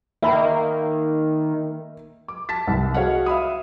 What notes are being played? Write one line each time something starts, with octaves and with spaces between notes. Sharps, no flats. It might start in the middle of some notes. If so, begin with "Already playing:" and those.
D#3 A#3 E5 B5
D6
A5 A6 B6
C2
F#4 G#4 C#5 D#5 F5 F#5
E5 F5 B5 D#6